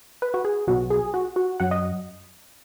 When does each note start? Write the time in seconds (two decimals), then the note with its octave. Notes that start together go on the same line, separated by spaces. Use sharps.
0.22 B4
0.34 F#4
0.45 G#4
0.67 B1 B2 F#3 F#4
0.90 G#4
1.14 F#4
1.36 F#4
1.60 F#2 F#3 F#5
1.71 D#5